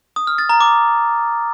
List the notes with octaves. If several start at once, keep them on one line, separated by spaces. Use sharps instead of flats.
D#6
F6
A6
A#5
D6